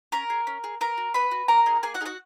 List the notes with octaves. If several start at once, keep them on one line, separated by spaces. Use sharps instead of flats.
C#4 A#4 A#5
G#4
C#4
G#4
B3 A#4 A#5
F#4
B3 B4 B5
F#4
A#3 A#4 A#5
D#4 G#4
A#3 G#4 G#5
F#4 F#5
D#4 F#4 G#4 F#5